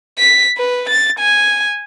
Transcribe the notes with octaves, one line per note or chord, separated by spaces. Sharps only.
B6
B4
A6
G#5